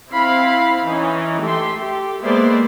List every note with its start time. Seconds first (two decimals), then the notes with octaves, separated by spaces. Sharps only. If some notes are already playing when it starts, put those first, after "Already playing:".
0.11 C4 E4 F5 B5
0.86 E3 C#4 D#4
1.43 A3 G4 A4 E5 C6
1.78 G4 A4
2.22 G#3 A#3 B3 C5 D5 E5